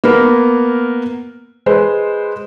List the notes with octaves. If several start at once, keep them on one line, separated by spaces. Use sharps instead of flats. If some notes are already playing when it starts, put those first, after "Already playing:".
A#3 B3 A#4
G#3 B4 C5